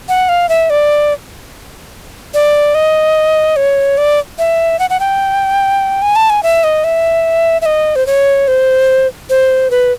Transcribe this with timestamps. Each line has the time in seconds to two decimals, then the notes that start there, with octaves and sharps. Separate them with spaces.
0.09 F#5
0.29 F5
0.49 E5
0.70 D5
2.34 D5
2.75 D#5
3.56 C#5
3.98 D5
4.39 E5
4.79 F#5
4.90 F#5
5.00 G5
6.02 G#5
6.16 A5
6.30 G#5
6.43 E5
6.64 D#5
6.84 E5
7.62 E5
7.66 D#5
7.96 C5
8.07 C#5
8.48 C5
9.30 C5
9.71 B4